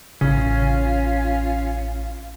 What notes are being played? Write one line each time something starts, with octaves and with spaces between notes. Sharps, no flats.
A1 C#3 C#4 F4